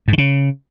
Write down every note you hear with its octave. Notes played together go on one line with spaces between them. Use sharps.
G#2
D#3
C#3